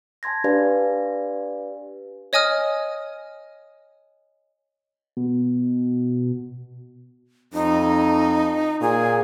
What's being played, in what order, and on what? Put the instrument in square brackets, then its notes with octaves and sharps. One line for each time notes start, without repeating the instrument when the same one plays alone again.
[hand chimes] G#5 A5 C6 G#6 A#6
D4 G4 B4 D5 F5 G#5
[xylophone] C#5 D#5 G#5 D#6 F6
[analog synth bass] B2
[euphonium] F2 [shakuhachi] D#4
[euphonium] A#2 [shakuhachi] G#4